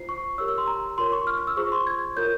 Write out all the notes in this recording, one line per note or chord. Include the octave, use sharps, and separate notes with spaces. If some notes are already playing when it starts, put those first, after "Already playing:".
Already playing: F4 C5 C7
C#6
G4 A#4 C#5 E6
E6
C6
A#5
F4 A#4 C#5 C6
C#6
F6
F6
E6
F4 G#4 C5 C#6
C6
G#6
F4 A#4 C#5 G6